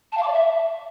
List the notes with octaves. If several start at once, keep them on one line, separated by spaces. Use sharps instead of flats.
A5
F5
D6
D5
E5